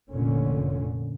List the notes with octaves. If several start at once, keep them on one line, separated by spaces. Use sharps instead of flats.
F1 A#2 D3 C#4